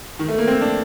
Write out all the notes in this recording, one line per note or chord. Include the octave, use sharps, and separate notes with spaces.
D#3
A3
A#3
C4
D4